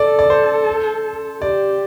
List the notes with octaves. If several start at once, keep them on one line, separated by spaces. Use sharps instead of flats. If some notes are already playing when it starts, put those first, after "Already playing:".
Already playing: A4 D5
D5
C5
G4 D5